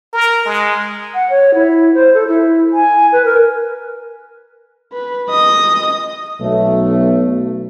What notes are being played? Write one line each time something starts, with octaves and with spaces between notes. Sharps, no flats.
A#4
G#3
F#5
C#5
E4
C5
A4
E4
G#5
B4
A#4
B4
D#5 D#6
B1 A3